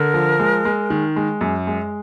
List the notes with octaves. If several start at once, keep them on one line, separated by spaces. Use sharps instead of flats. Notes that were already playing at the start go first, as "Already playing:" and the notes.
Already playing: D3 A#4
F3
G#3
G#3
D#3
G#3
F#2
G#3